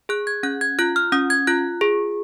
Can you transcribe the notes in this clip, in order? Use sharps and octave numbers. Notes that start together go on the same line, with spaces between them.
G#4 F#6
G#6
C#4 F#6
G#6
F4 F#6
F6
C#4 D#6
G#6
F4 F#6
G#4